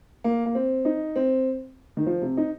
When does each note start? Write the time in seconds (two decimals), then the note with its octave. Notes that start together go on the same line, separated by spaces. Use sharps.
0.24 A#3
0.46 A#3
0.55 C4
0.85 D#4
1.16 C4
1.97 D#3
2.06 F3
2.22 C3
2.37 D#4